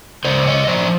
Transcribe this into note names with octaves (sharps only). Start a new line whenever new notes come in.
C#3 C5 D5
C#5 D#5
F3 C5 D5